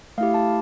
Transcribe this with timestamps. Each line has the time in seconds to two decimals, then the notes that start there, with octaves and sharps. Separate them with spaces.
0.18 A3 E4 G4 F5
0.34 A5